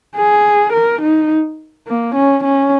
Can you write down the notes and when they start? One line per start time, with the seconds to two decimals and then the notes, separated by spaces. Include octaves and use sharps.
0.16 G#4
0.73 A#4
1.02 D#4
1.87 A#3
2.16 C#4
2.44 C#4